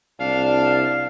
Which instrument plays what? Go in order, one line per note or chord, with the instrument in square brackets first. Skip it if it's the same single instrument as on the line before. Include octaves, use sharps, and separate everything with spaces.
[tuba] C2 [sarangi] D4 [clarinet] F5